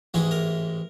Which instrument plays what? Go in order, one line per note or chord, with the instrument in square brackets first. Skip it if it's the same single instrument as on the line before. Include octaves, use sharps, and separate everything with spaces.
[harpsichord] A1 G#2 E3 G#3 G#4
A#4